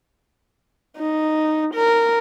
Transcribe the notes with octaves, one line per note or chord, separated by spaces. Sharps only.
D#4
A#4